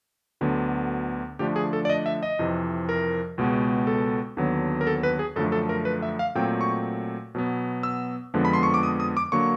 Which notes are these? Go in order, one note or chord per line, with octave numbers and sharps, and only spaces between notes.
D2 D3 F#3 B3
D3 F3 A3 D4 G4
G#4
A4
D5
D#5
E5
D#5
F2 C3 E3
A#4
C#2 B2 G#3 B3
A4
D#2 D3 F#3 B3
A#4
A4
B4
G#4
F#2 D3 F3 A3 A4
A4
A#4
B4
E5
F5
A#2 F#3 A3 C4 G5
C#6
B2 F#3 B3
E6
F2 D3 F3 G#3 B3
B5
C6
C#6
D6
D#6
D#6
D6
D3 F#3 A#3 C#6